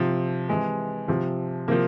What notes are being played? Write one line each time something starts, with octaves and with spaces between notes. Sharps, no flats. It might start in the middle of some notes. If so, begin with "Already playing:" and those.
Already playing: C3 F3
C3 E3 G#3
C3 F3
C3 F3 A#3